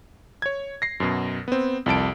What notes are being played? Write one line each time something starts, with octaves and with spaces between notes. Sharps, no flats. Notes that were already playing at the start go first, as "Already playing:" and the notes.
C#5 G#6
A#6 C7
F#2 B2
B3 C4
C2 F2 A5 D7